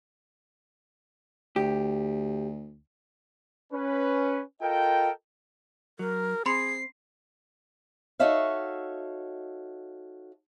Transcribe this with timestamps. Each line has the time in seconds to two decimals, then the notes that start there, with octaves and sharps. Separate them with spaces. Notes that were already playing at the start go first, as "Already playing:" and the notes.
1.56 D2 G4
3.73 C#4 B4
4.62 F4 A4 A#4 D#5 G5
5.99 F#3 A#4
6.46 C4 G#4 B5 C6 C7 C#7
8.19 D#4 F#4 A4 C#5 E5 F5